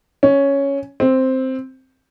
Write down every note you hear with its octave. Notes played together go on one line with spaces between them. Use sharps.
C#4
C4